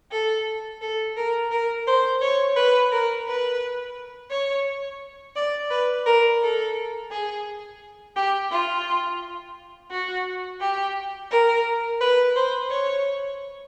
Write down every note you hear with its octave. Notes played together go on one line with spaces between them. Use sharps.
A4
A4
A#4
A#4
C5
C#5
B4
A#4
B4
C#5
D5
B4
A#4
A4
G#4
G4
F4
F#4
G4
A#4
B4
C5
C#5